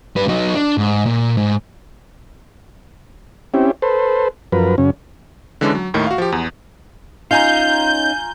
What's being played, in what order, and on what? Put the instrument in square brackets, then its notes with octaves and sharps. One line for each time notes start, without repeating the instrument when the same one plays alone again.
[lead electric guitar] G3 B4
F#3 D#4
D4
G#2
A#2
G#2
[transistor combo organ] C4 C#4 E4 G4
A4 B4 C5
F#2 F3 A#4 B4
F#2 C#3 C#4
[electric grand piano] D3 E3 G#3 C#4 D4
F#3
D#2 A2 D#3 A3
F#4 F5
F3 G4
E2
[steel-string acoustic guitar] C#4 D#4 [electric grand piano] F4 G#5 A#5 [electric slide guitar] F5 [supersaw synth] G6